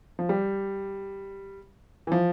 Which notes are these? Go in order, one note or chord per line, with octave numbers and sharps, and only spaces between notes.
F3
G3
E3
F3